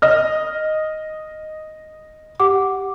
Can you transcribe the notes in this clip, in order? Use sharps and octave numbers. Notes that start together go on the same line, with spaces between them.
D#5 F6
G4 F#5 D6